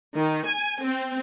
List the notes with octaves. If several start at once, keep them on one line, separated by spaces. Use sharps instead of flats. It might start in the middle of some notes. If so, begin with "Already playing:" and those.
D#3
G#5
C4